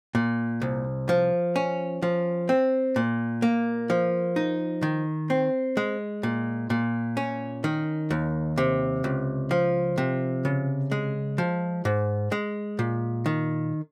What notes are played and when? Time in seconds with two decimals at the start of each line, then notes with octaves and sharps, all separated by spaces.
0.15 A#2
0.62 C2
1.09 F3
1.56 C#4
2.02 F3
2.49 C4
2.96 A#2
3.42 A#3
3.90 F3
4.36 D#4
4.82 D#3
5.30 C4
5.77 G#3
6.23 A#2
6.70 A#2
7.17 C#4
7.64 D#3
8.10 D#2
8.58 C3
9.04 C#2
9.51 F3
9.98 C3
10.45 C#3
10.91 G#3
11.38 F3
11.85 G#2
12.32 G#3
12.79 A#2
13.26 D#3